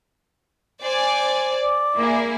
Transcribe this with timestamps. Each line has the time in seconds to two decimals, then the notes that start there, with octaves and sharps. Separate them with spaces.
0.82 C5 D5 G#5
1.61 D5
1.98 A#3 E4 G#4